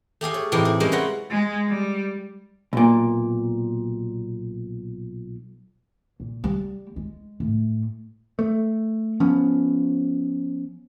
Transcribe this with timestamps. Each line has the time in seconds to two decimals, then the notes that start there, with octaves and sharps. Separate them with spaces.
0.21 A3 G4 G#4 F5
0.34 C#5
0.52 A2 C3 E3 D#4 E4 G4
0.65 G#4
0.80 G3 G#3 A#3 C#4 E4
0.92 B4 C#5 F#5 A#5 C6
1.30 G#3
1.68 G3
2.73 B1 A#2
6.20 A#2
6.44 G3
6.96 G#3
7.40 A2
8.39 A3
9.20 F3 B3 C#4